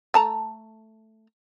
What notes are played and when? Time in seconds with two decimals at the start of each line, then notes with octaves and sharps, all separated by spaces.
0.14 A3 A5 A#5